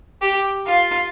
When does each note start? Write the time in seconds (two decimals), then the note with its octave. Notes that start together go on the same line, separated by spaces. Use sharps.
0.22 G4
0.67 F4